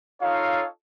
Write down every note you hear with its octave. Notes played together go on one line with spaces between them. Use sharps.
D#4 F4 A4 C#5 F5